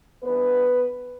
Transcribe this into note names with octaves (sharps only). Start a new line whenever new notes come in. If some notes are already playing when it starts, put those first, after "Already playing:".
G2 E3 B3 B4